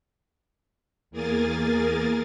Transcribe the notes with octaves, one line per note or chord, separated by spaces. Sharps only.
E2 A#3 G#4 A#4 G#5 A6